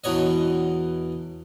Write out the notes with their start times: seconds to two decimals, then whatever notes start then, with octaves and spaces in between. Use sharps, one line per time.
0.04 E2 B2 C#5 D#5